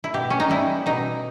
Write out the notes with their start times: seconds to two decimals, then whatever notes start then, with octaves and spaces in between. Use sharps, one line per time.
0.04 E4
0.14 B2 G4
0.30 C#4
0.40 D#4
0.49 G3 E4
0.86 B2 D#4